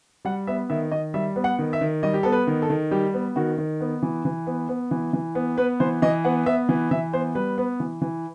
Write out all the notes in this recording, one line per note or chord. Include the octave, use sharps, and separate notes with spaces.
G3 F#5
B3 E5
D#3 E5
D#3 D#5
G3 E5
B3
F#5
D#3
E5
D#3
G3 D#5
G4
B3 A4
B4
D#3
A4
D#3
G3 G4
B3
D#3 F#4
D#3
B3
E3
E3
B3
B3
E3
E3
B3
B3 B4
E3 C5
E3 D#5
B3 F#5
B3 E5
E3
E3 E5
B3 C5
G3 B4
B3
E3
E3